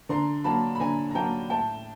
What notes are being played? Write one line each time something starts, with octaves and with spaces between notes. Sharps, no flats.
D3 A#5 C6
F#3 A#3 A5 B5
B5
D3 G#5 A#5
A#5
F#3 A#3 G5 A5
A2 G5 A5